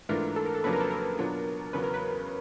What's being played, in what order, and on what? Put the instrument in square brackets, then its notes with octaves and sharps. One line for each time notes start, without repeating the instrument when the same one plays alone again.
[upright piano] G#2 E3 A3 D4 F4 [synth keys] A#4
[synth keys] A4
A#4
A4
[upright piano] F2 C#3 F#3 A#3 D4 [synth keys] B4
[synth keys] A#4
A4
A#4
[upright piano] B2 F#3 B3 D4 F4
[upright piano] E2 C#3 F#3 [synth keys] B4
[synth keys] A#4
B4